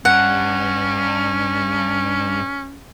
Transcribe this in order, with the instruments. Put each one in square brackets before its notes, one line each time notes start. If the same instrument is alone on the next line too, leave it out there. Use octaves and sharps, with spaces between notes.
[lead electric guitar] G2 [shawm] C#4 [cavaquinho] F#5